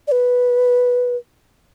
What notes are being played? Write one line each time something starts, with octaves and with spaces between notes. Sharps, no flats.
D5
B4